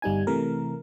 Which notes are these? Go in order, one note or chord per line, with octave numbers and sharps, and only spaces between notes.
G1 G3 D#4 G#5
C3 E3 A3 A#4